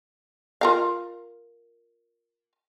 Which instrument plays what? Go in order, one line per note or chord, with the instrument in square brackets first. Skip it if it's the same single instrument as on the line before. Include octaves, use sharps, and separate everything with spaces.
[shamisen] F4 A#4 F5